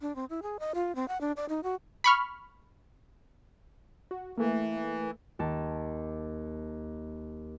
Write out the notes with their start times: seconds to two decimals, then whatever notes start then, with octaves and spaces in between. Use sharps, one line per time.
0.01 D4
0.16 C4
0.30 E4
0.43 G#4
0.60 D#5
0.75 F4
0.95 C4
1.08 F#5
1.21 D4
1.37 D5
1.49 D#4
1.63 F#4
2.04 B5 C#6 F6
4.11 F#4
4.38 E3 A3 A#3
5.39 D#2 A5